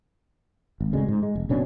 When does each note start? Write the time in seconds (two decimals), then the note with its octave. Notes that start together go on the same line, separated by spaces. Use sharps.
0.81 G#1
0.93 D2 C#3 G#3 D4
1.08 G#2
1.23 G#3
1.35 F1
1.49 F#1 B2 C#4 D4